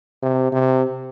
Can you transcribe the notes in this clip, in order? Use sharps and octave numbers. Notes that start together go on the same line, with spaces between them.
C3
C3